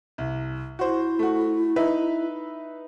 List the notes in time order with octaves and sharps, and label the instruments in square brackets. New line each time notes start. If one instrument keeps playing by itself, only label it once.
[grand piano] C2
[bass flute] E4 [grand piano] F#4 C5
[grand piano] A3 F#4
D#4 B4 E5